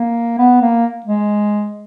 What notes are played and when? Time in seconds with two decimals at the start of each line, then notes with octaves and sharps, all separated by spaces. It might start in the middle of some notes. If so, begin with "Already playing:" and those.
Already playing: A#3
0.39 B3
0.62 A#3
1.06 G#3